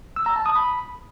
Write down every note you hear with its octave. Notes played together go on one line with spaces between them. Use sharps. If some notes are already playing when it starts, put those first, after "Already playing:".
E6
A#5
A5
D#6
B5